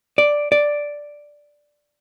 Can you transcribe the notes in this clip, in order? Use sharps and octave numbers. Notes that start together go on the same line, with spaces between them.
D5
D5